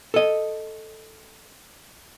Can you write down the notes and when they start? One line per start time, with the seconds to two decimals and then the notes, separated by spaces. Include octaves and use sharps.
0.14 A4 D#5